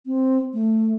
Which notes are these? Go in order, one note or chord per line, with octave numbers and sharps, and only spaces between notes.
C4
A3